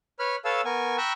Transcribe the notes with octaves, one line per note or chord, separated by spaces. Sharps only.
B4 C#5 B5 F6
A4 B4 C#5 F5 A5 E6
B3 A#4 G#5 C#6
G5 A#5 B5 C#6 E6 F#6